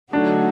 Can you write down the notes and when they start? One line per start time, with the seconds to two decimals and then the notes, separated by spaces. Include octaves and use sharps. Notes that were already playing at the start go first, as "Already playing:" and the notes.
0.12 D3 F#3 A3 D4 D#4 F#4